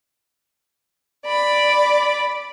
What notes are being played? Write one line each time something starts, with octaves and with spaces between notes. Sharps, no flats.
D5 B5